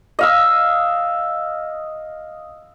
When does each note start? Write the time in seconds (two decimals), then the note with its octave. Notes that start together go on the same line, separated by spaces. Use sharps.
0.19 D#5 F5 E6